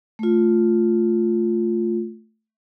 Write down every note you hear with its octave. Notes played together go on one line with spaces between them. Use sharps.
A3 F4